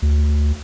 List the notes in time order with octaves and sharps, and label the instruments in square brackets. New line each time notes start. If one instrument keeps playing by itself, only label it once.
[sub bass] D2